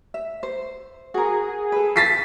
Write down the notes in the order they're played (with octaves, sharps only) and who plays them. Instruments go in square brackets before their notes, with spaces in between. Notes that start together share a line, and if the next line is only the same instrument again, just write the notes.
[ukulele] E5
C5
[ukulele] F#4 A#4 [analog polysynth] G#4
[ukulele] A4 B4
[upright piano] A6 B6 C7